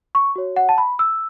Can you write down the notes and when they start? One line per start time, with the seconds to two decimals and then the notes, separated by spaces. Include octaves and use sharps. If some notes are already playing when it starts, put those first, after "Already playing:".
0.15 C#6
0.36 F#4 C#5
0.56 F#5
0.69 A5
0.78 B5
0.99 E6